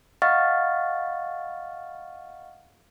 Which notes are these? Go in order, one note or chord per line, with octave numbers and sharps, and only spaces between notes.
D#5 F5 F#5 C#6 F6 A6